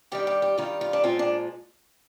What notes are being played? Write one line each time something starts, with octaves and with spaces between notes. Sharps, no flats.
G2 D#3 G3 G4
G4
G4
G2 D#3 G3 F4
F4
D4
A#2 F3 G#3 C4
D4